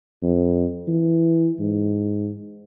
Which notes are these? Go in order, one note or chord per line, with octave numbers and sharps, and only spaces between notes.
F2
E3
G#2